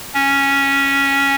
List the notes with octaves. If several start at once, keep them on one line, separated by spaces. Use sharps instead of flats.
C#4